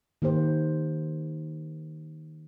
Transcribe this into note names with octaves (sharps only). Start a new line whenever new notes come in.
D#3 A#3 G4 C5